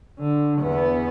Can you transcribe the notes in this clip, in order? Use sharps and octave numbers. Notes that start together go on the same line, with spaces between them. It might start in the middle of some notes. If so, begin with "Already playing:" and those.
D3
E2 B3